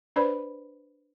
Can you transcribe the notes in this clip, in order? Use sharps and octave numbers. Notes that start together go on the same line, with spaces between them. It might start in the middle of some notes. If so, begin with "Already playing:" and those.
D4 B4 C5 D5 B5